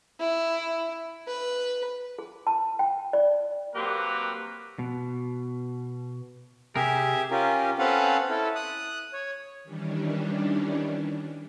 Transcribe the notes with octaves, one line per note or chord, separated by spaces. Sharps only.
E4
B4
G#4
A5
G5
D5
F#3 A#3 C4 G4 A#4 B4
B2
C3 G4 G#4 A#4 E5
C#4 F4 G4 A#4
C4 C#4 A4 B4 F5 F#5
E4 A4
D#6 F#6
C#5
D#3 E3 G3 C#4 D4